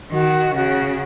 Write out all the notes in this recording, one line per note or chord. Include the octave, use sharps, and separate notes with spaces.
D#3 F#4
C#3 F#4